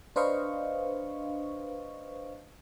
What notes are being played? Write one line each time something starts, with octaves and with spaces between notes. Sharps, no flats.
D4 B4 C5 D#5 F5 C#6